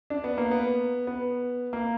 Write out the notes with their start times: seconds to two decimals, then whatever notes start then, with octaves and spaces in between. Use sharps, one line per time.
0.10 D4
0.24 B3
0.38 A#3
0.51 B3
1.07 B3
1.73 A#3